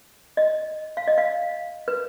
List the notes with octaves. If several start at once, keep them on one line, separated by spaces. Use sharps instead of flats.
D#5
F5
D#5
F5
B4